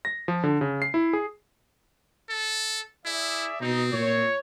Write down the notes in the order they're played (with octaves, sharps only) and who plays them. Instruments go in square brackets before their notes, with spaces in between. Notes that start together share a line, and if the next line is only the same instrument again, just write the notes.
[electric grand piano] A#6
F3
D3
C#3
C7
E4
G#4
[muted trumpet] A4
[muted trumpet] E4 [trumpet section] G#4 D5 E5
[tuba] B2 [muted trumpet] C4 [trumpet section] D#4
[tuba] A#2 [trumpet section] C#5